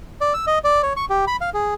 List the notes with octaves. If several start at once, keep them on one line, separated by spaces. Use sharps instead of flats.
D5
E6
D#5
D5
C#5
C#6
G4
B5
F5
G#4